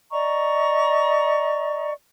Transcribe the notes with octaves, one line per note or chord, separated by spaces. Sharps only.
D5 D#5 A#5 C#6